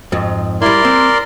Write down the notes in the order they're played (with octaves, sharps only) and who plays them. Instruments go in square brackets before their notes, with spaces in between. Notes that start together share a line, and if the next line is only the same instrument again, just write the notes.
[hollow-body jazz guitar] F2 G#2
[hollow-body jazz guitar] G3 E4 [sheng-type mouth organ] A#4 D5 C6
[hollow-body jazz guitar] C4